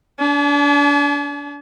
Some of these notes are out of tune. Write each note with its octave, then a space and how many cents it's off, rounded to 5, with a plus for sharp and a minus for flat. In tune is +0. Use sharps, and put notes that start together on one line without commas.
D4 -30 G#5 +45